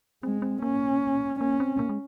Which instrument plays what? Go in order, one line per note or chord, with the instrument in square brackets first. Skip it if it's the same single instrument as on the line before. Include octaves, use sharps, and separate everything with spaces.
[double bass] G#3 [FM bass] C4
[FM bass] C4
[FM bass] A#3 [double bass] C#4
[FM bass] A#3 [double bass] C#4
[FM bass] C4
A#3
G#3